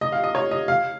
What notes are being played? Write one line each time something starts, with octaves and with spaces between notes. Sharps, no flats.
D#5
F5
D#5
C#5
D#5
F5